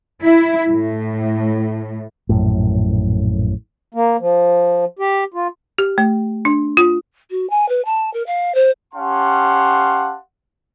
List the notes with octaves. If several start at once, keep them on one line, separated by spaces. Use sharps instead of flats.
E4
A2
A#1 F#2 A2
A#3
F3
G4
F4
G4
A3
D4
F4
F#4
G#5
B4
A5
A#4
F5
C5
C#4 G4 F5 F#5 A5 C6